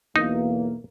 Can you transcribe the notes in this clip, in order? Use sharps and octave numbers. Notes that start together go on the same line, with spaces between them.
B1 E2 A#3 D#4